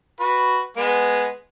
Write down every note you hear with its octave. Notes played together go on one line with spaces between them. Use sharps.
F#4 B4
G#3 B3